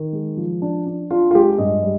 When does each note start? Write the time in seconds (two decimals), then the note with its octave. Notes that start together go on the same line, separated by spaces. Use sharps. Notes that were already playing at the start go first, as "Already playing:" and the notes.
Already playing: D#3
0.13 G#3
0.37 F3
0.62 D4
0.86 D4
1.11 D4 F4
1.31 F4
1.35 G#3 G4
1.58 G2 D#5
1.83 G3